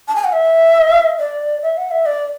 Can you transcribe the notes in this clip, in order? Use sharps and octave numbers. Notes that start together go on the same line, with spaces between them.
A5
G#5
F#5
E5
D5
E5
F#5
E5
D5